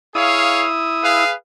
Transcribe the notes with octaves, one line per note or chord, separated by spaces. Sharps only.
E4 G#4 C#5 F5 D#6
G#4 B4 F5